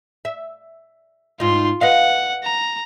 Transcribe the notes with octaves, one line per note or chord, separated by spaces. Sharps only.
E5
G#2 D#4 F4 C6
B4 D#5 F5 F#5
A#5